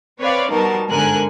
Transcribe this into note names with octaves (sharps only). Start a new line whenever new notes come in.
C4 B4 C#5 D5 F5
B2 G3 D#4 A#4 A5
G1 G#2 D3 A#4 G#5 F#6